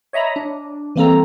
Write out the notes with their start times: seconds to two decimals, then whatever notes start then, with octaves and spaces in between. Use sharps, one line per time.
0.13 C#5 D#5 E5 A#5 B5
0.36 D4
0.96 E3 G3 A#3 C4 A4 A#5